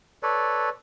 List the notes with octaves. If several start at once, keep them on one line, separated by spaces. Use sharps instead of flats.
A4 B4 C#5 D5